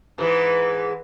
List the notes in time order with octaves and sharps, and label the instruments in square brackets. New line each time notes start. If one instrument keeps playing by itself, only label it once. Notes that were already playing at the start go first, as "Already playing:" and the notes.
[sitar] G#2 E3 G#3 [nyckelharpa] B4